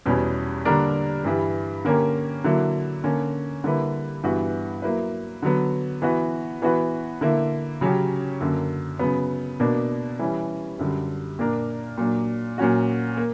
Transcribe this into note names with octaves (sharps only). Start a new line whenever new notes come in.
E2 B2 G3 C#4
D3 G3 A#3 D4 A#4
G2 E3 G3
D3 A#3 C#4 G4 A#4
D3 F#3 A#3 E4
D3 A#3 C#4
D3 G3 A#3 E4 B4
G2 E3 B3 F#4 B4
F#3 A#3 E4 B4
D3 F#3 B3
E3 B3 F#4
E3 B3 F#4 B4
D3 A#3 E4
C#3 F#3 C#4 G4
F#2 D3 A#3
C#3 F#3 B3
B2 A#3 D4
E3 G3 C#4
F#2 D3 G3
A#2 A#3 D4 A#4
A#2 F#3 A#3 D4
A#2 F#3 C#4 F#4
A#3